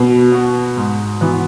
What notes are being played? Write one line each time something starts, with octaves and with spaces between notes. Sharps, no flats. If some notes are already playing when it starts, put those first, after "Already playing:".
Already playing: B2
B3 F#4
G#2
E3 B3 F#4